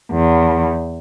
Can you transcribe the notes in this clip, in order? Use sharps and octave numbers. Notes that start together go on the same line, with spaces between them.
E2